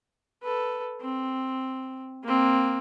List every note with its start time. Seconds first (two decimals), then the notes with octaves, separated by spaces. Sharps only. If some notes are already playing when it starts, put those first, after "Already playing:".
0.43 A4 B4
1.01 C4
2.24 A#3 C4